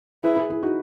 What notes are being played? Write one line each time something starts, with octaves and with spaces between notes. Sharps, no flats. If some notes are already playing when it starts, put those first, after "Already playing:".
E4 G#4 B4
E4 G#4
E4 G#4
D#4 F#4